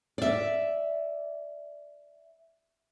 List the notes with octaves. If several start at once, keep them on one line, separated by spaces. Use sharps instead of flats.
D5 E5